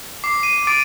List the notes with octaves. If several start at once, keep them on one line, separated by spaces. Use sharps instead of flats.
D6 C7
D#7
D6 A6 D7